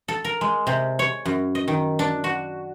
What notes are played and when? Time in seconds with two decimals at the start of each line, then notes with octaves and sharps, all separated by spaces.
0.08 A4
0.24 A#4
0.41 G#3
0.67 C3
0.99 C#5
1.26 F#2
1.55 D#5
1.68 D#3
1.99 D4
2.24 F#4